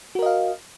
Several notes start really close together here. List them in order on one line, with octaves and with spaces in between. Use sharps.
F#4 A#4 D#5 F5